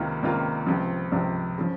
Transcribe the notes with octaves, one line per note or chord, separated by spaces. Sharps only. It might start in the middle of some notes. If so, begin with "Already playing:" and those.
Already playing: C#2 C3 D#3 A#3 F4
C#2 C3 D#3 A#3 F4
C#2 C3 F3
C#2 C3 F3
C#3 F3